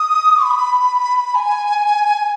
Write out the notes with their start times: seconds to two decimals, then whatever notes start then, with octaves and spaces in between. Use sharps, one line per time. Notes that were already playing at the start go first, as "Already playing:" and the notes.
Already playing: D#6
0.44 B5
1.35 G#5